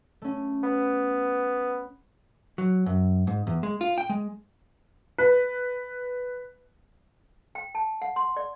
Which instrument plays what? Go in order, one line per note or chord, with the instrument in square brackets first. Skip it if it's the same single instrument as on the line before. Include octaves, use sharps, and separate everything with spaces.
[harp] A3 C#4
[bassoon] B3
[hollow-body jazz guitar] F#3
F#2
G#2
E2
G#3
F4
G5
G#3
[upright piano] B4
[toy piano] G5
A5
F#5
C6
D5